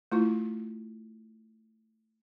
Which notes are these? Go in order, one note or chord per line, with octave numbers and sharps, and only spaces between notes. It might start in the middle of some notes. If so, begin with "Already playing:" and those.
A3 E4 F4